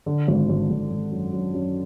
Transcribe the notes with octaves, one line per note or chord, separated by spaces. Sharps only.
D3
G#1
G#1
G#1
G#1
F#2
F#2
F#2